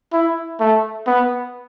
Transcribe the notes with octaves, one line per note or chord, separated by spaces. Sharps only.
E4
A3
B3